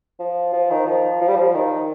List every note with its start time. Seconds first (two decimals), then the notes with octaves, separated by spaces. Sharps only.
0.20 F3
0.53 F3
0.71 D#3
0.87 F3
1.21 F3
1.28 G3
1.36 F3
1.54 D#3